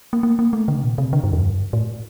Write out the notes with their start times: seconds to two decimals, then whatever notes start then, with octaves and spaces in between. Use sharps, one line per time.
0.13 A#3
0.23 A#3
0.39 A#3
0.53 A3
0.68 D3
0.76 C3
0.84 A#2
0.98 C3
1.13 D3
1.24 G2
1.33 F2
1.43 G2
1.73 A2